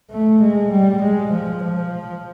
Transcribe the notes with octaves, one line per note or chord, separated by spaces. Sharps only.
A3
G#3
G3
G#3
F3
F3